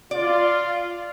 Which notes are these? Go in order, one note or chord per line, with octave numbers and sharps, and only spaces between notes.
F4 D5